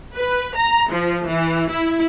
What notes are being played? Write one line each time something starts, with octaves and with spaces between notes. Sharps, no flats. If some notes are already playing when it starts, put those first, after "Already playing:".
B4
A#5
F3
E3
E4